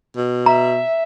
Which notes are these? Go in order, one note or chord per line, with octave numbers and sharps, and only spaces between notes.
B2
E5 A#5